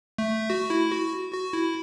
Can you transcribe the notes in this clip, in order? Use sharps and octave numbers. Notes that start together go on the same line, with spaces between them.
A3
F#4
E4
F#4
F#4
E4